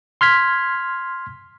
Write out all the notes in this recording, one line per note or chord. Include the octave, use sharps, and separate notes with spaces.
C6 F6 G#6 B6